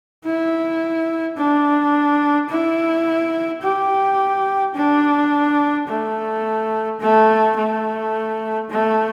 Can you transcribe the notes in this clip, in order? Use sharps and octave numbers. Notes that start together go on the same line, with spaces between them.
E4
D4
E4
G4
D4
A3
A3
A3
A3